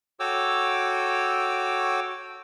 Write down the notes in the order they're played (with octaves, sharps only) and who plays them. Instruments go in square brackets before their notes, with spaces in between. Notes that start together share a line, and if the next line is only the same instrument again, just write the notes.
[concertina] F#4 A4 C#5 G5 D6 E6